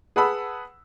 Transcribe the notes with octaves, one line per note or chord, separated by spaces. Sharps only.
G#4 B4 F#5 A5 B5 E6